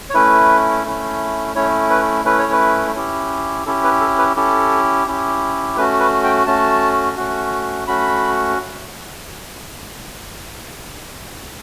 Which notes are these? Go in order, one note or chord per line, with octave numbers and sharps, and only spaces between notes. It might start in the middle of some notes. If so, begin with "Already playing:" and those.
C#5
A3 C#4 E4 B4
A3 C#4 E4
A3 C#4 E4 C#5
B4
A3 C#4 E4 B4
C#5
B4
C#4 E4 G4
C#4 E4 G4 A4
B4
A4
B4
C#4 E4 G4 A4
C#4 E4 G4
A3 C#4 F#4 B4
B4
G5
A3 C#4 F#4 A5
A3 C#4 F#4
A3 C#4 F#4 B5